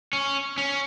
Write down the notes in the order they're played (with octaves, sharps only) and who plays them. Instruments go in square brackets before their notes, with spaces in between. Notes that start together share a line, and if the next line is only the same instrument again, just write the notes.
[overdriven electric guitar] C#4
C#4